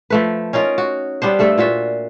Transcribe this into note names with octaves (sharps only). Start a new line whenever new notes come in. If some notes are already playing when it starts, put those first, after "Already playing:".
F3 A3 B4
C#4 D#4 F4 A#4
F#4
G3 B3 D4 C5
G2 A3 A4 E5
A#2 F4 F#4 E5